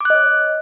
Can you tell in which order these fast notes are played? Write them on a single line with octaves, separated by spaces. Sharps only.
D6 F#6 D#5 C#5